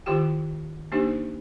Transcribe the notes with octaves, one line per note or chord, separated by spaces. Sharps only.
D#3 E4 F4 G4 G5
A#3 D4 D#4 G4 C5